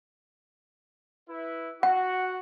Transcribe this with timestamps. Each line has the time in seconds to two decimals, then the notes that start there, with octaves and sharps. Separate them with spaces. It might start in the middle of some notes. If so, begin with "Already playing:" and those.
1.29 E4 B4
1.83 F#4 F#5